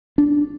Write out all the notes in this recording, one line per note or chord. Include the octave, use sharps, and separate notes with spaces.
D4